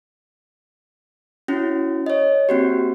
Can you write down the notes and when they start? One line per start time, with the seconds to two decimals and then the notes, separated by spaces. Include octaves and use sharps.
1.48 C#4 E4 F#4
2.06 C#5 D#5
2.49 A#3 C4 F#4 G4